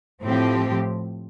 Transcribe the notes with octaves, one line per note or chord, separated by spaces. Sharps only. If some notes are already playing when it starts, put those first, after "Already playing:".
A2 F3 C4 G4